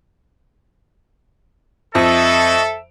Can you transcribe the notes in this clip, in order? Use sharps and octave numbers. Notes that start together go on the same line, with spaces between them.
F2 A4 D#5 E5 C#6